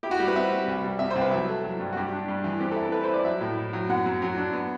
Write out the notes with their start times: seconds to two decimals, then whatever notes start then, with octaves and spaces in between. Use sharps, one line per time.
0.03 E4 G4
0.11 F#4
0.19 G3 G4
0.28 B4
0.36 C4 E5
0.51 G3
0.68 C2
0.84 G3
0.99 C3 E5
1.10 C5
1.16 C2
1.21 B4
1.31 F#3 E5
1.48 A3
1.64 F#3
1.80 G2
1.93 F#4
1.96 G2 G4
2.13 D4
2.28 G2
2.44 E3
2.60 C4 G4
2.71 A4
2.76 E4
2.82 A4
2.92 A3 B4
3.04 C5
3.09 E4 D5
3.25 F#3 E5
3.41 A2
3.57 E4
3.73 F#3
3.89 F#2 F#5
4.06 F#2
4.22 F#3
4.37 D4
4.53 B3